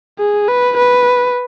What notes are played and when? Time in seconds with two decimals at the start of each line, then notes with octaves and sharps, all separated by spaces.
0.19 G#4
0.48 B4
0.77 B4